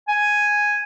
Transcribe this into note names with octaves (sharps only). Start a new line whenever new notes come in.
G#5